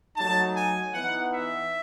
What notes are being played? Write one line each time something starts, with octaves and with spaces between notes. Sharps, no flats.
F#3 A3 D#4 A5
G#5
E3 B3 D#4 F#5
E5